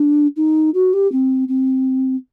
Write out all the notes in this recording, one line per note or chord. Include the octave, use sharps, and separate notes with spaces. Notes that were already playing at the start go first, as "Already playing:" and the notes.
Already playing: D4
D#4
F#4
G4
C4
C4